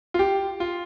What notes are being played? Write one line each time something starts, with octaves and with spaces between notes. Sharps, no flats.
F4
G4
F4